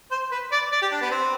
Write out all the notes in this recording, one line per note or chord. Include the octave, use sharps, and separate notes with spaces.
C5
B4
D5
D5
G4
D4
B3
C4